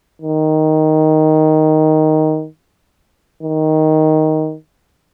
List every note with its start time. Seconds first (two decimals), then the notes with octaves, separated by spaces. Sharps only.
0.22 D#3
3.43 D#3